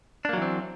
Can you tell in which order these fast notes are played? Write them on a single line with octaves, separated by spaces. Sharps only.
D4 A#3 F#3 E3 C4